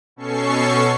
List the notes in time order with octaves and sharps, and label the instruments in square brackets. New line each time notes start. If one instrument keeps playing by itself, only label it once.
[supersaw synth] B2 C#4 A4 C#6 C7